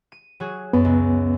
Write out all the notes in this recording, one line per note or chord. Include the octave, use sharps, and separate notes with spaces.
D#7
F#3 F#4 G#4
F#2 B3
C#2